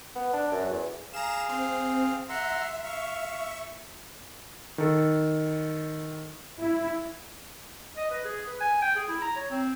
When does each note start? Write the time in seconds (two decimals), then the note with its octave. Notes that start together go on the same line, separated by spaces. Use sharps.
0.16 B3
0.33 D4
0.52 F#2
0.70 E2
1.14 G#4 F5 A#5 E7
1.49 C4
2.29 E5 F#5 A#5 C6
2.83 E5 F5 C#6
4.78 D#3 A4
6.59 E4
7.97 D#5
8.11 B4
8.25 G#4
8.47 B4
8.61 G#5
8.82 G5
8.96 G#4
9.08 E4
9.22 A#5
9.36 C#5
9.51 C4